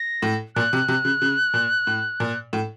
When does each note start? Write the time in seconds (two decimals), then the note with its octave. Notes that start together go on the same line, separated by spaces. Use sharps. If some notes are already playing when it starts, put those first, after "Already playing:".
Already playing: A#6
0.22 A2
0.55 A#2 F#6
0.73 C3
0.88 C3
1.05 C#3
1.22 C#3
1.54 A#2
1.87 A2
2.20 A#2
2.53 A2